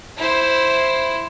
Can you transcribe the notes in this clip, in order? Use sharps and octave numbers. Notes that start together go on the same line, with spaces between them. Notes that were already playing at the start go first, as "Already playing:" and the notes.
E4 C5